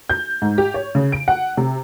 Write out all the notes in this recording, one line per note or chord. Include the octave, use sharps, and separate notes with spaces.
G6
G#2
G4
C#5
C#3
D7
F#5
C3